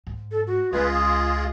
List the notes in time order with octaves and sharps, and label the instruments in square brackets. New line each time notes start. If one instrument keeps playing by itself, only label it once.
[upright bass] G#2
[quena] A4
F#4
[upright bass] C#2 [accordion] G#3 F4 G#4 [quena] B4
[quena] D#6